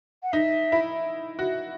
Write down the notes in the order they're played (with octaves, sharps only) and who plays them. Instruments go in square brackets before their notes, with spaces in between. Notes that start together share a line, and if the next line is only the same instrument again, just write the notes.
[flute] F#5
[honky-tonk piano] D#4 [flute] E5
[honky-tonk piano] E4
F#4